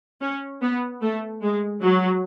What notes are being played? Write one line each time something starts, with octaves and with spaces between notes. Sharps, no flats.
C#4
B3
A3
G#3
F#3